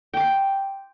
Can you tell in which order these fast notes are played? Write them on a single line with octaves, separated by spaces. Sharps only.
G5 D6 C6